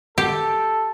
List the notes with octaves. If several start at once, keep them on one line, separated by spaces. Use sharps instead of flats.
G4 A4